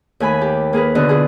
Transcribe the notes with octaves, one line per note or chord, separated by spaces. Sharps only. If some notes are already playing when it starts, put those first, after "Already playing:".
D#2 A3 G#5 B5
G4
A#3 G#4 A#4 B4
B2 D3 B3 F#4 D#5
E4 F4 G#4